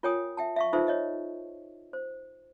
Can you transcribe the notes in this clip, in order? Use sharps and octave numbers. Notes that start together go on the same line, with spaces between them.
F4 A#4 C#5 G5 G#5 D#6
E5 G5 A5
E5 F5 C#6
D#4 F4 A4 B4 C5 E5
C#5 D#5 E5
C5